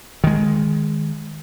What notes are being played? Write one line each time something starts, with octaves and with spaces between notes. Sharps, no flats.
D#3 G#3